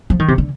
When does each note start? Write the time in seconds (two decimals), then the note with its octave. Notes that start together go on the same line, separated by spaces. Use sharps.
0.10 F3
0.19 D#3
0.28 C3
0.38 D3